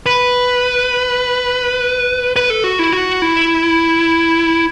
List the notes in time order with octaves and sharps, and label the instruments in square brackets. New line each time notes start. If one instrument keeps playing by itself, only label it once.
[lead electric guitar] B4
B4
A4
F#4
E4
F#4
E4